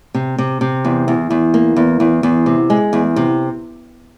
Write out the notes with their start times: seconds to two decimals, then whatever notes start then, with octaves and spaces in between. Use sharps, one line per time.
0.14 C3
0.38 C3
0.61 C3
0.85 E2
1.08 E2
1.30 E2
1.54 A#3
1.76 E2
2.00 E2
2.23 E2
2.46 C3
2.70 G#3
2.93 E2
3.16 C3